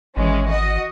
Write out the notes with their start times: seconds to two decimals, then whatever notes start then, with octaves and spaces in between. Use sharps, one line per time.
0.17 G#1 E3 G#3 C#4
0.49 F#4 D#5